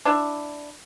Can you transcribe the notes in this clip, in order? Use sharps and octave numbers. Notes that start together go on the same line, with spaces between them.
D4 E4